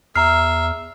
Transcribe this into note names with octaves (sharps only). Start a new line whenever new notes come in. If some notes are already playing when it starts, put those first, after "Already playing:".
E2 E5 A#5 F6 C7